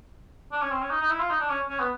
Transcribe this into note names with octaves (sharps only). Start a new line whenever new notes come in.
D4
C#4
C4
C#4
D#4
D#4
E4
F4
D#4
D4
C#4
C#4
B3